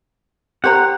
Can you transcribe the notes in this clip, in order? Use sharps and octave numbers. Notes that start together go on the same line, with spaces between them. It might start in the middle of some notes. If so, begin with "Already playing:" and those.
G4 C5 F#5 A#5